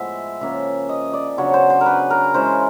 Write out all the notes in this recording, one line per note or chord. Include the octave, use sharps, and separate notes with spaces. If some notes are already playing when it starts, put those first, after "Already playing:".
Already playing: A2 F3 G#3 B3 E5
C#3 F3 A#3 C#4 E5
D#5
D5
C#3 F#3 B3 D4 C#5
C5
C5
A#4
B4
A#4
E3 G#3 C#4 C5